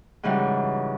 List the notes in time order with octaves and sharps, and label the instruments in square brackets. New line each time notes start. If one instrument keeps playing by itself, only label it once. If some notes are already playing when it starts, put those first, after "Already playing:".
[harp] G#2 C#3 E3 F#3 G3